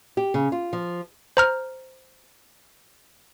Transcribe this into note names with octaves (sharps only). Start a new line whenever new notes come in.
G4
C#3
F4
F3
C5 A#5 F6